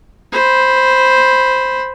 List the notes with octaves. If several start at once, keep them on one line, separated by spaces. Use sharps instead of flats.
C5 B5